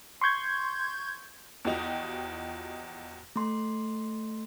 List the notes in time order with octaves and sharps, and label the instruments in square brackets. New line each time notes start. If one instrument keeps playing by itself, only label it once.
[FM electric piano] C6 C#6 G6 G#6
[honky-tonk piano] E2 F3 F#4 G4 D#5 F7
[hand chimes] A3 C6